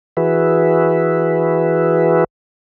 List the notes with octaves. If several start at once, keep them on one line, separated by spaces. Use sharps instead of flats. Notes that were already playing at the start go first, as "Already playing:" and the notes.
E3 F#4 G#4 B4 E5